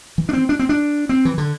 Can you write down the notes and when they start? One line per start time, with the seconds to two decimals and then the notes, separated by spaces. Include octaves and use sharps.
0.18 E3
0.29 D4
0.33 C4
0.49 D4
0.59 C4
0.69 D4
1.09 C4
1.25 E3
1.38 D3